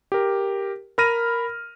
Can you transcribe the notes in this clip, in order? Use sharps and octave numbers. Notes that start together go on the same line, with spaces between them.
G4 A#4
A#4 B5 F6 A#6 D#7